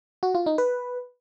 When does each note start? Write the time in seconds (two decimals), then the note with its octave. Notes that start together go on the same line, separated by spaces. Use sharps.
0.23 F#4
0.35 F4
0.46 D#4
0.58 B4